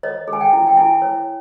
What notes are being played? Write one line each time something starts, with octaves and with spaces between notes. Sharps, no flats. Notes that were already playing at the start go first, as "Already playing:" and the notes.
C#5 D#5
G#4
G#5
G5
E4
G5
E4 G#5
C#5